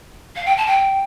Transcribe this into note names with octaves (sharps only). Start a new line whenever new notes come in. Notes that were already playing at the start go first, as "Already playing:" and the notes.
F5
G5
A5
G5